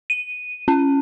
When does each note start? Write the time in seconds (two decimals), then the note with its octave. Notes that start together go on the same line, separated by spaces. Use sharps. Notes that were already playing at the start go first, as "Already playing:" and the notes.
0.10 D#7
0.68 C#4